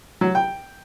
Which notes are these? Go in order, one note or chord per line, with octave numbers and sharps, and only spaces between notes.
F#3
G5